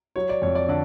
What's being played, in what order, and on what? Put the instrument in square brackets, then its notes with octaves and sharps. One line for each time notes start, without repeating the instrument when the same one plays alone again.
[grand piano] F#3 C#5
D5
F2 C#5
D5
D3 D5